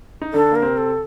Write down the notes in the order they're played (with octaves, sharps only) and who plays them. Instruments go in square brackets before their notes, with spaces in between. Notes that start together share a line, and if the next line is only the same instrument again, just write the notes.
[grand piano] D#4
[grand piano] D3 D4 [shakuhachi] A4
[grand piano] A#3 [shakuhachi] A#4
[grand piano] C3 C4
[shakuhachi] A4